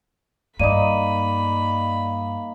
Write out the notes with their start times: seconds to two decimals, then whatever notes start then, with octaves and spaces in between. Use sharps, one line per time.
0.60 G2 A#3 D#4 D5 B5 D#7